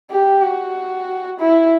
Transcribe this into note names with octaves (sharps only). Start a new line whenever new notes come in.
G4
F#4
E4